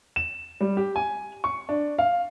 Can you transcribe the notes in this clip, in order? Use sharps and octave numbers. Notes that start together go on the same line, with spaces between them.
E7
G3
G4
G#5
C#6
D4
F5